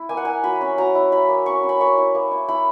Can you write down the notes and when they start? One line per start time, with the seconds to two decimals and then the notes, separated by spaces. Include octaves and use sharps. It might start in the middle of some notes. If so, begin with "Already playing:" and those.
Already playing: E4
0.09 A#3 G#5
0.17 F#5
0.25 E4 G#5
0.44 F#3 B5
0.61 C#4
0.78 F#3 A#5
0.95 E4
1.12 E4 B5
1.29 A#3
1.46 C#4 C#6
1.63 C#4
1.69 B5
1.80 A#3 C#6
1.98 E4
2.15 A#3
2.31 E4
2.48 E4 B5